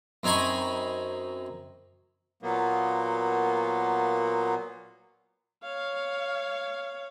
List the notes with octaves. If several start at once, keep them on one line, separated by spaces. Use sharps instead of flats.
F#2 C4 D#4 G#5 B5 C#6
A#2 F#3 A#3 B3
C#5 F5